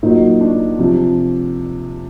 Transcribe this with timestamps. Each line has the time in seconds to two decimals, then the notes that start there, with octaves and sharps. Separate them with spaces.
0.03 A#2 F#3 D#4
0.41 D4
0.79 C3 F3